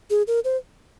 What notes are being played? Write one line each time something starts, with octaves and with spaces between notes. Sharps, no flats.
G#4
A#4
C5